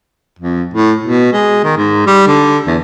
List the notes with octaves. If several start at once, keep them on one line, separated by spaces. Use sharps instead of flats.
F2
A2
B2
G#3
D#3
G#2
G3
D3
E2